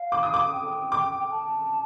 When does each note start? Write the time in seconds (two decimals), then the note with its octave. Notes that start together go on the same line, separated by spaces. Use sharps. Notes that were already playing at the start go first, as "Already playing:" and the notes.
Already playing: F5
0.12 D6
0.23 D#6
0.34 D6
0.52 G5
0.92 D6
1.31 A5